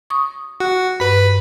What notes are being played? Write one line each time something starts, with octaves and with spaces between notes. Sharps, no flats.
C#6 D#6
F#4 F#6
G2 B4 B6